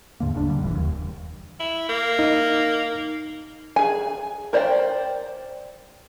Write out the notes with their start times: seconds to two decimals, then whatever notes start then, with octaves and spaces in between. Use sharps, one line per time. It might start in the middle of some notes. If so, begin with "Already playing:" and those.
0.20 E2 G#2 D3 A#3
0.34 D#1 D2 C#3 D4
0.47 F#2 D3 G3
0.61 E1 A#1 G#2 E3
0.75 D#2
1.60 E4
1.89 A#3
2.19 D#4
3.76 G#4 G#5
4.53 A#4 C5 D5 F#5 G5